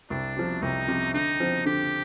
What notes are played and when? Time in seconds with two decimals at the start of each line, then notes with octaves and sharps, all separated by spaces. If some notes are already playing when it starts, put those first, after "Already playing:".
0.10 C2 D4
0.37 C3 F3
0.62 C2 D#4
0.88 C3 F3
1.14 D3 D#4
1.40 F3 C4
1.65 D3 G4